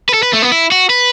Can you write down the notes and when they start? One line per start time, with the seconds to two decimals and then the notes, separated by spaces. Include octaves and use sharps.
0.09 B4
0.14 A4
0.23 B4
0.33 A3
0.42 B3
0.52 E4
0.72 F#4
0.90 B4